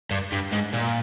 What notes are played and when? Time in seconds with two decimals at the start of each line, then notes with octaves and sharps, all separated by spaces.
0.11 G2
0.32 G2
0.53 G#2
0.74 A#2